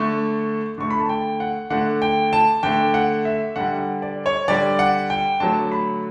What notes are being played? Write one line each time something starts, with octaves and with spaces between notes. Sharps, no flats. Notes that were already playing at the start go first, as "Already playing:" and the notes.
Already playing: D3 A3 C#6
D3 A3 C#6
B5
A5
G5
F#5
D3 A3 F#5
G5
A5
D3 A3 G5
F#5
E5
D3 G3 F#5
F#5
D5
C#5
D3 G3 D5
F#5
G5
D3 F#3 A3 A5
B5